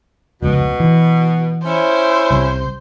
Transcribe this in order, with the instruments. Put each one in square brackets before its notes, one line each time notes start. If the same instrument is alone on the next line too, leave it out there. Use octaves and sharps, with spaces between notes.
[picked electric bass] F1 C#2 [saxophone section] B2
[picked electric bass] E3
[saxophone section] C#4 E4 [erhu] C5
[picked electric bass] C2 C3